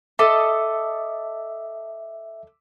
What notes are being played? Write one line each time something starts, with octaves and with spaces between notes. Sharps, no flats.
A4 D#5 E5 D6 E6